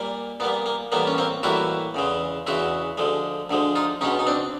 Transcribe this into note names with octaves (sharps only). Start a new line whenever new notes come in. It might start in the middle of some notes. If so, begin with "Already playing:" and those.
Already playing: A#2 G3 A#3
A#2 G3 A#3 B3
A#3
A2 E3 G3 A#3 B3
C#4
A#3 C4
A2 E3 G3 A#3 E4 F#4
E2 C#3 E3 G#3
E2 C#3 E3 G#3 E4 F#4
D2 D3 F3 G#3
D2 D3 F3 G#3
D#4 F4
C#2 B2 G#3 C#4 D#4
D#4
C4 D4